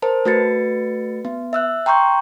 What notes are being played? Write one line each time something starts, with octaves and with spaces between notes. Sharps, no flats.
A#4 C5 A5
A3 F#4 B4 A6 C#7
B3
E5 E6 F#6
G5 A#5 C6 C#6 G6